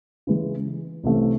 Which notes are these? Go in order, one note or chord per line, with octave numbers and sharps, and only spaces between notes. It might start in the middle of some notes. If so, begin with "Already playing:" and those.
C#3 E3 G#3
C2 C3 E3 A3 C#4